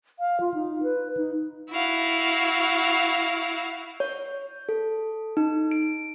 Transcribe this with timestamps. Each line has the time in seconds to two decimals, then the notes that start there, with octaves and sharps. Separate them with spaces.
0.20 F5
0.41 F4
0.54 D#4
0.83 B4
1.17 D#4
1.69 E4 F#4 F5
4.00 C#5
4.69 A4
5.37 D#4
5.71 D7